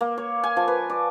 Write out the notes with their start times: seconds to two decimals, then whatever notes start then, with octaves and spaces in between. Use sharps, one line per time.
0.01 A#3
0.18 C#5
0.44 G#5
0.57 F3
0.68 B4
0.90 D5